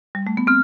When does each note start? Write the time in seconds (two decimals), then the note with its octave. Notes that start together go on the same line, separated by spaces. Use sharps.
0.15 G3
0.27 A3
0.37 B3
0.47 C4 F6